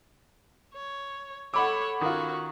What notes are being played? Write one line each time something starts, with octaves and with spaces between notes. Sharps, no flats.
C#5
A4 C#5 F#5 B5 D6
D#3 C#4 F4 F#4